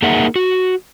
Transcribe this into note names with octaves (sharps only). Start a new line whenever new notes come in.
A#3 D#4 G#4 A#4 E5 F#5
F#4